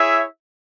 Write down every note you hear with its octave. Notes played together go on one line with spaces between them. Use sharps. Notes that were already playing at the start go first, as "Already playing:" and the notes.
Already playing: E4 G#4 C#5 E5